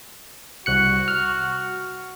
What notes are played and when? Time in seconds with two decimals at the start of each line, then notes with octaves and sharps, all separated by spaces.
0.66 C2 F#4 F#6 C#7
1.08 F6